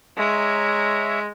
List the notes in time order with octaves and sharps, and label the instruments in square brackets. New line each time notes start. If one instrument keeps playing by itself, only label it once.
[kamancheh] G#3 [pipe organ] C#5 E5 A#5